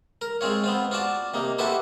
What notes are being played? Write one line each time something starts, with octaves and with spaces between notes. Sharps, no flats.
A#4
G#3 C4 F4 C#5
B3 C4 F4
F4 F#4 D5 A5
C3 A#3 D#4
E4 F#4 G4 A4 B4 C5